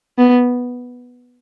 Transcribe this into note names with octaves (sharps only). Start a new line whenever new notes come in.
B3